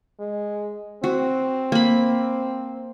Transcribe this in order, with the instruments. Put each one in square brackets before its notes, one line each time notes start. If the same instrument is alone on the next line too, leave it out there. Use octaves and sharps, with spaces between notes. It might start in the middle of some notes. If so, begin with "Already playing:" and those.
[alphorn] G#3
[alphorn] C4 [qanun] F#4
[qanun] A#3 B5